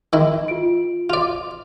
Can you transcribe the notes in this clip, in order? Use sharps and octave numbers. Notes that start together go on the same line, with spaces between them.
D#3 E4
F4 D7
F4 D5 F7